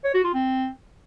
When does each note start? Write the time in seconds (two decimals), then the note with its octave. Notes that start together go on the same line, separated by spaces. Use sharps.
0.04 C#5
0.14 F#4
0.24 F4
0.34 C4